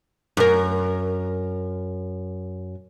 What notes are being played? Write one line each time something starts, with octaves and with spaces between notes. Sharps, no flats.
F#2 A#4